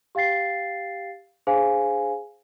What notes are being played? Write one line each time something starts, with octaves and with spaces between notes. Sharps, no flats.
G4 F5 G5 A6 C7
D4 G#4 C5 F5 G#5